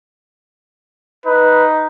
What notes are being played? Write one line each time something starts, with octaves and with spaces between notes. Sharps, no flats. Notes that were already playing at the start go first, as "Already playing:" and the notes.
D#4 B4